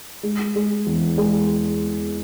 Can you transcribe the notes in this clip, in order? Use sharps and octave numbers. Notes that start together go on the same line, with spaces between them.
G#3
G#3
E2
G#3